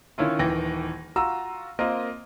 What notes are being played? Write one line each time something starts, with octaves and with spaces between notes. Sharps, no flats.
D#3 C#4 E4 F4
D#1 D#3 E3 G5 A#6
F4 F#4 A#5 E6
A#3 C4 F4 A#4 D#5